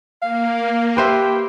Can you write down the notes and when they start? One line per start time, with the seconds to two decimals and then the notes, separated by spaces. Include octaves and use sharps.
0.22 A#3 F5
0.97 G4 B4 C5 E5